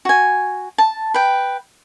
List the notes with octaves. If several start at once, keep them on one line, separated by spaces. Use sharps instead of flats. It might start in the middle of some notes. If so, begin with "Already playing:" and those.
F#4 G#5
A5
B4 G5